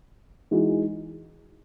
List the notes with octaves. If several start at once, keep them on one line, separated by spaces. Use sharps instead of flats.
E3 G#3 D#4 F#4